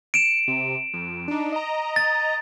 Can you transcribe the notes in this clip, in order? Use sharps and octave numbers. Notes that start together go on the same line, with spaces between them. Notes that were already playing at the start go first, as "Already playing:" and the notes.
C#7 D7 E7
C3
F2
D4 D#4
D#5 A#5
A6